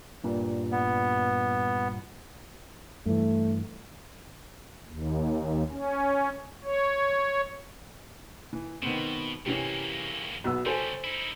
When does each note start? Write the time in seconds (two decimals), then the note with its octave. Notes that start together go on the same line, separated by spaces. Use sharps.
0.24 G2 A#2 G3
0.72 B3
3.06 G2 E3 A3
4.86 D#2
5.71 C#4
6.64 C#5
8.53 E3
8.82 B2 D#3 B3 C4
9.46 E2 C3 E3 A#3 C#4
10.44 B1 B3 E6
10.66 C#3 G3 A4 C5 G#5
11.04 D#4 E4